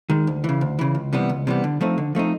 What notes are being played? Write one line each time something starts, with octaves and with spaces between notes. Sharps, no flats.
D#3 G#3
D2
C#3 E3
D2
C#3 E3
C#2
C3 E3 G3 B3
C#2
C3 E3 G3 B3
D3
F3 A3 C4 D#4
D3
F3 A3 C4 D#4